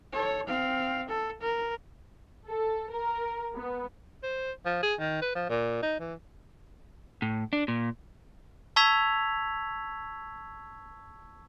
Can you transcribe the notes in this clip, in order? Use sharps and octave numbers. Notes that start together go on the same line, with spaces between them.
A4 C#5
C4 F5
A4
A#4
A4
A#4
B3
C5
F3
G#4
D#3
B4
F3
A#2
D#4
E3
A2
D4
A#2
A5 C#6 E6 G#6 B6 F7